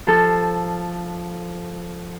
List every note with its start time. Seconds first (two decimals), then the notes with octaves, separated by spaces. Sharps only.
0.07 F3 A4